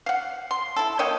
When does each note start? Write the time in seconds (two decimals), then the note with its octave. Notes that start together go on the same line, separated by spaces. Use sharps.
0.06 F5 F#5
0.51 C6
0.76 E4 A4
0.99 A#3 C#5 D#5 G5